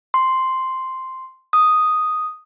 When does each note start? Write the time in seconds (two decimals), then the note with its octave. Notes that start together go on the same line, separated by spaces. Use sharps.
0.14 C6
1.53 D#6